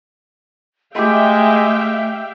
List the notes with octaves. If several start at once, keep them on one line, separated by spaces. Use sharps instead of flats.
G#3 A3 G4 E5 F5 G5 C6